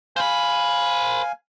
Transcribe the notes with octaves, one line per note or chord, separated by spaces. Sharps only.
C5 F5 G#5 B5